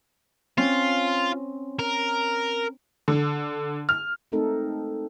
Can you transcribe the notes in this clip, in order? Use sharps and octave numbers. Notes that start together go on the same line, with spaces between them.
C4 C#4 F4
A#4
D3
F6
G#3 A3 C4 D#4 A4 A#4